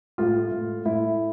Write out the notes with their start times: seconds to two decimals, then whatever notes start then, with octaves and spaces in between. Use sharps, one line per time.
0.18 A2 F4
0.52 A2
0.85 A2 E4